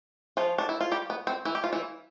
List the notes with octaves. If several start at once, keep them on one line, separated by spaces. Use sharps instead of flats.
F3 F4
D4
E4
F4
G3 G4
B3
C4
E3 E4
G4
F4
E3 E4